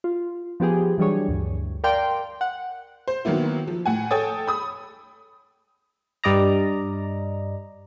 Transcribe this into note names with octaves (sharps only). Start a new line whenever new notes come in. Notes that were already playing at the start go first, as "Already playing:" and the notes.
F4
F3 B3 G4 G#4
E3 F#3 G3 D4 G#4 C#5
D2 G2
A#4 D5 F5 G5 C6
F#5
C5
D#3 F#3 A#3 B3 E4
F3
A2 F#5 G#5
A4 C#5 G5 G#5 D#6 A6
B5 D#6
G2 G3 D5 D#5 A#5